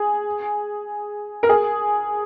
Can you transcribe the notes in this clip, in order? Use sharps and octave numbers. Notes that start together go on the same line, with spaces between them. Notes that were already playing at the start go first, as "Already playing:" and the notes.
Already playing: G#4
A#4
G#4